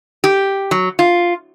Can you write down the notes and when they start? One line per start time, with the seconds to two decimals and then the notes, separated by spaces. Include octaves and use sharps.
0.24 G4
0.71 F#3
0.99 F4